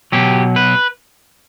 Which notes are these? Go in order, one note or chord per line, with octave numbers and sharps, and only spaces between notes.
B2 F#3 G4
B4